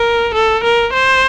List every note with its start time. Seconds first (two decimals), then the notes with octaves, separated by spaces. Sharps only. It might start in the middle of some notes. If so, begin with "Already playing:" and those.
Already playing: A#4
0.34 A4
0.64 A#4
0.93 C5